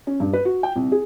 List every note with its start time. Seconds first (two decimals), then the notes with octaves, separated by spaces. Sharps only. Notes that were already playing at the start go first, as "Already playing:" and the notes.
0.07 C#4
0.20 G2
0.33 B4
0.45 F#4
0.63 G5
0.76 C2
0.92 G#4